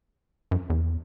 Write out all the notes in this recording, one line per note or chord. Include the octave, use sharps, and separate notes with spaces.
F#2
E2